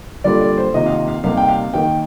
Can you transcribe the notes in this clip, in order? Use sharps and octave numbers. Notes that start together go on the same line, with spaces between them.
D3 G3 A#3 F4 D5
D5
C5
C3 D#3 A#3 F4 D#5
F5
D#5
F5
C3 G3 A#3 D#4 F5
G5
F5
D#3 A#3 D#4 G5